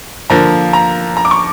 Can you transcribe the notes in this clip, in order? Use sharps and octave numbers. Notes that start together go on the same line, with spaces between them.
D3 F3 A#3 A#5
A#5
A#5
D6
C#6